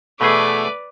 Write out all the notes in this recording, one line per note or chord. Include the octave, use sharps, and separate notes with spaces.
B2 E3 A3 G#4 B4 D5